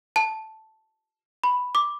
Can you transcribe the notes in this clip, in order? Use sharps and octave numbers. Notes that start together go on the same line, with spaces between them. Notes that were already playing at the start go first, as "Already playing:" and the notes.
A5
B5
D6